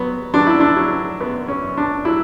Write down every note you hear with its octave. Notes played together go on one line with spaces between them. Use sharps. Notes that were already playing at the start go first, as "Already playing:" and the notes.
Already playing: F#3 B3
F#3 D4
E4
D4
F#3
F#2 B3
C#4
F#2
D4
F#3 E4